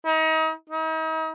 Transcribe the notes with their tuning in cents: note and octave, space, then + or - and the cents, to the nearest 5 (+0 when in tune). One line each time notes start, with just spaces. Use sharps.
D#4 +35
D#4 +40